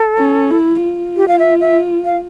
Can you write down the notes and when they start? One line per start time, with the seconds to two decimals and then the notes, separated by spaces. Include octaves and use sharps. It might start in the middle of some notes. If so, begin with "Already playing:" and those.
Already playing: A4
0.17 C#4
0.51 E4
0.83 F4
1.17 G4
1.28 F5
1.39 E5
1.61 E5
2.05 F5